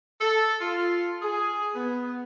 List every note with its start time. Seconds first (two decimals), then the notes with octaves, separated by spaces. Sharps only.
0.21 A4
0.61 F4
1.22 G#4
1.75 B3